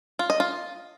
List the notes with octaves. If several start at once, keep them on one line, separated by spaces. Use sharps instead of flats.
F4
D#5
F4